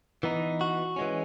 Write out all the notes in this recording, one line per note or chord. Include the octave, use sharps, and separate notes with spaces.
E3 B3 D#4
F#4
E3 G#3 C#4